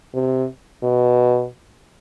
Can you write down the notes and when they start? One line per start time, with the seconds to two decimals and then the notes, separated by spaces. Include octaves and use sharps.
0.14 C3
0.83 B2